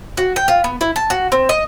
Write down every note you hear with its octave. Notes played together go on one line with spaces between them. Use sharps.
F#4
G5
F4
B3
E4
A5
F#4
C4
D#5